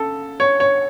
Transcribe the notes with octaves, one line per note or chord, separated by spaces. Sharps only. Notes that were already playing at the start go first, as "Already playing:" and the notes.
Already playing: C#3 A4
C#5
C#5